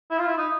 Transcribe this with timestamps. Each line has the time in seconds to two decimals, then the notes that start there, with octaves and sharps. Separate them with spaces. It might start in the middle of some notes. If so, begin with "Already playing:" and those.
0.10 E4
0.19 F4
0.28 E4
0.38 D#4